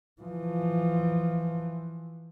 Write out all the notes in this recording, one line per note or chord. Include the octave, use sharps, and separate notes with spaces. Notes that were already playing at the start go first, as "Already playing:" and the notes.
E3 F3